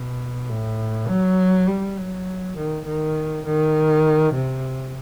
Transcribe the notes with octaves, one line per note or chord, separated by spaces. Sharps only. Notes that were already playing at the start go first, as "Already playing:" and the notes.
Already playing: B2
A2
F#3
G3
F#3
D#3
D#3
D#3
C3